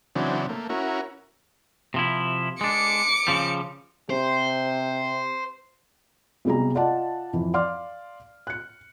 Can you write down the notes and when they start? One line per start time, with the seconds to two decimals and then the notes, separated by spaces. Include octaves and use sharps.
0.16 C#3 E3 F#3 C4 D4
0.49 A3 A#3
0.69 C#4 E4 F#4 A#4
1.94 C3 F3 E4
2.61 G#3 D4 D6 C#7
3.27 C#3 F3 G3
4.10 C3 C5
6.45 B1 C3 G3 G#4 A#5
6.75 F4 D5 D#5 F#5 A5
7.33 F2 E3
7.54 D5 F5 C6 D6 F6
8.47 F#6 C#7